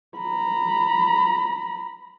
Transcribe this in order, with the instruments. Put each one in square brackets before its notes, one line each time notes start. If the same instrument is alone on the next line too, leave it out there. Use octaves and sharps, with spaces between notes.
[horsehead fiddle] A#5 B5